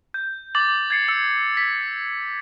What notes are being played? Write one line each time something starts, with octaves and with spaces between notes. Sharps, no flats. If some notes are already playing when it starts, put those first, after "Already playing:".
G6
D6 A6 F#7
G#6 A6 C7 C#7
E6 C#7
B6